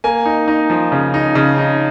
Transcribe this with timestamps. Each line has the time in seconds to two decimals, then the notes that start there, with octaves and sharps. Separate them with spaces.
0.04 A#3 G#5
0.25 D#4
0.48 D#4
0.70 F3
0.92 C#3
1.14 D#4
1.35 C#3
1.58 D#4